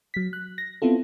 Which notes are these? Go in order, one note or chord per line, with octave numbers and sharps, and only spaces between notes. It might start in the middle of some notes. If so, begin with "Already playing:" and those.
F#3 B6
F#6
A#6
B3 C4 E4 F4 A4